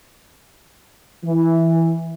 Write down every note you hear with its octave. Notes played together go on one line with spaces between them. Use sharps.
E3